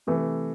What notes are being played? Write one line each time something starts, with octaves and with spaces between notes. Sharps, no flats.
C3 E3 A3